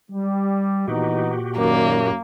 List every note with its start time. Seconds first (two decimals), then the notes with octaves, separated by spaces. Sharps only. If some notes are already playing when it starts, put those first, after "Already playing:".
0.11 G3
0.88 A#2 E3 B3 D#4 F#4 G4
1.58 F#2 D#3 A#3 D5